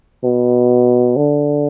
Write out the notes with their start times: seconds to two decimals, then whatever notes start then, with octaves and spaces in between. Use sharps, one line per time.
0.24 B2
1.17 D3